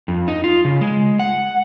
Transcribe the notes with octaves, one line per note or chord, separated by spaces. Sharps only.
F2
D#4
F4
C#3
G#3
F#5